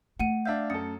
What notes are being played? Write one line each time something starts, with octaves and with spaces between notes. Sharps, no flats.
A3 F#5 D#7
D4 E5 F5 G6
F#2 A4 D#6 A6 C#7